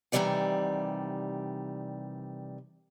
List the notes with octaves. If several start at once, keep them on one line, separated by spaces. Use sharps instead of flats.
C3 D#3 E3 G3 D5 F#5